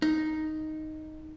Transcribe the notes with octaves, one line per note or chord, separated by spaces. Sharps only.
D#4